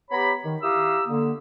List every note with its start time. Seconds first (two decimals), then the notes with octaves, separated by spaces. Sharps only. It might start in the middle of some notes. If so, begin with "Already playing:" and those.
0.11 B3 G4 C#5 A#5 B5
0.44 D#3
0.62 E4 G4 F5 A#5 D#6 E6
1.07 D3 A#3